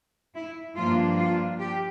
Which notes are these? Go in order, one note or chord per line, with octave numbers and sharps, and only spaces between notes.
E4
G2 F3 A#3 D4 F4
F4
G4